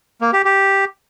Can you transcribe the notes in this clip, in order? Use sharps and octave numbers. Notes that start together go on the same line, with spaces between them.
A#3
G4
G4